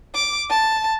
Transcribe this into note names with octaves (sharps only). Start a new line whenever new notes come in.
D6
A5